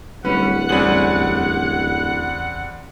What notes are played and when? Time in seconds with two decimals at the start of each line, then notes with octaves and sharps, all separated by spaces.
0.25 D1 G3 C#4 B4 F#5
0.69 E2 G3 C4 C#4 G#4 F#7